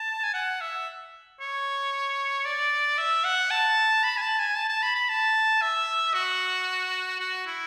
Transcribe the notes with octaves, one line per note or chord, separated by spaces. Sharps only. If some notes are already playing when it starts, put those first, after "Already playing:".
Already playing: A5
G#5
F#5
E5
C#5
D5
E5
F#5
A5
B5
G#5
A5
G#5
A5
A5
B5
B5
A5
E5
F#4
F#4
E4